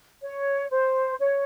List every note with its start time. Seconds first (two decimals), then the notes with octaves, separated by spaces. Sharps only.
0.22 C#5
0.71 C5
1.20 C#5